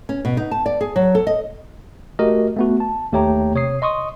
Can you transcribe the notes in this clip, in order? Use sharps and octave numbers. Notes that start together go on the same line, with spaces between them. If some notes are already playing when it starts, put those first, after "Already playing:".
C#4
B2
D#4
A5
D5
G#4
F#3
A4
D#5
A3 F#4 G4 A#4 D#5
A3 B3 F#4
A5
D#2 A3 G4 C#5 G5 A#5
C3 C#5 D#6 C7
D#5 C6 C#6 D#6